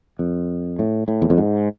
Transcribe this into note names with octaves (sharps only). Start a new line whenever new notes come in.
F2
A2
A2
E2
F2
G#2